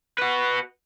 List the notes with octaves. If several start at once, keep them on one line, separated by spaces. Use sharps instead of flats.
F#4 B4